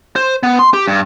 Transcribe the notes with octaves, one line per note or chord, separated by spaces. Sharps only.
C5
B3
C6
G4
G2